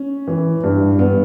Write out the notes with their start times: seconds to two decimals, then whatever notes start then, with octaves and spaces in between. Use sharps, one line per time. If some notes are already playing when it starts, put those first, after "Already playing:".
Already playing: C#4
0.27 E3
0.64 G2
0.99 G2 B3